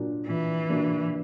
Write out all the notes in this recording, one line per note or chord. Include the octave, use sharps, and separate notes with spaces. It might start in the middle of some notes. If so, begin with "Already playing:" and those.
Already playing: A#2 F#3 A#3 D4
A#2 E3
F#3 A#3 D4